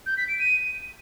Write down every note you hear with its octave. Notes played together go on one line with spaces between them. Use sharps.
G6
B6
D7
D#7